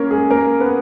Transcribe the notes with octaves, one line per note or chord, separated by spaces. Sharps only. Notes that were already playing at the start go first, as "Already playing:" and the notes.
Already playing: A#3 C#4 A#4 C#5
G#3 G#4
A#3 A#4
B3 B4